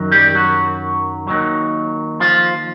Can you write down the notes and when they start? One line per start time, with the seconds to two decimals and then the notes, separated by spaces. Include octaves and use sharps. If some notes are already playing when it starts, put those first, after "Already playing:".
Already playing: F#2 D#3 F#3
0.12 G3 G4
0.35 F#3 F#4
1.27 D#2 D#3 F#3
2.20 F3 F4